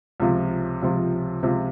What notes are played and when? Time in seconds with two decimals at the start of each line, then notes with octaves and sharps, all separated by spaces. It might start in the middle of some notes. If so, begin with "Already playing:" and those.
0.20 C#2 C3 F3
0.82 C#2 C3 F3
1.43 C#2 C3 F3